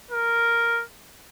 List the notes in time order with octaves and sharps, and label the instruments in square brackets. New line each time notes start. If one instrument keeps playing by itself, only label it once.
[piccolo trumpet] A#4